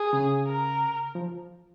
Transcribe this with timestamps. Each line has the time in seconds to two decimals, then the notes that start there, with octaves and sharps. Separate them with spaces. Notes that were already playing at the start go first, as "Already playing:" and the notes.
Already playing: G#4
0.13 C#3
0.47 A#4
1.15 F3